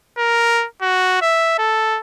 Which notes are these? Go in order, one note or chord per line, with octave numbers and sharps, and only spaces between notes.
A#4
F#4
E5
A4